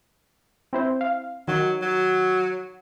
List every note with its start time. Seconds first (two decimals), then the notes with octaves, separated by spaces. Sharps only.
0.73 C4 E4 C5
1.01 F5
1.48 D#3 F#3
1.82 F#3